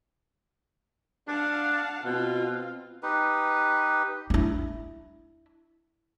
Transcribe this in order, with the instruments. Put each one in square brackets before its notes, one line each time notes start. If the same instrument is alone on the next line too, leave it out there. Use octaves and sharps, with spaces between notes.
[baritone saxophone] D4 [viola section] F5 F#5 A5
[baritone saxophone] B2 [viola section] C4 F4 F5
[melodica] D#4 G4 B4
[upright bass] D4 E4